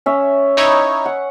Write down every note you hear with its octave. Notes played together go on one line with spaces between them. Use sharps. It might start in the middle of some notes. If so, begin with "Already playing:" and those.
C#4 E5
D#4 E4 C#5
F#5